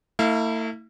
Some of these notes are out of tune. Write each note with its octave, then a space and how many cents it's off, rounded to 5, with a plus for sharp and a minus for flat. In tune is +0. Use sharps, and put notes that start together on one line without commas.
A3 +40 E4 -20 F5 -5